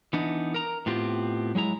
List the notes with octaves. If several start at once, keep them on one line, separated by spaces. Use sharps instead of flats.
E3 B3 D4 D#4
A#4 A#5
A2 B3 C4 F4 G4
F#3 G#3 E4 A#5